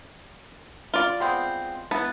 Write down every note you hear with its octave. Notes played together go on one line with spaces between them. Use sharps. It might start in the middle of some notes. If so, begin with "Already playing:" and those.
F4 D5
G#3 B3 C4
B3 E4 A5